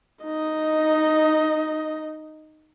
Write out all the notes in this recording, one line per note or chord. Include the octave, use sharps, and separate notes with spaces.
D#4 D#5